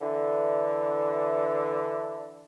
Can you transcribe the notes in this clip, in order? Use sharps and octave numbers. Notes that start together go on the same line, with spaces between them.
D3 E3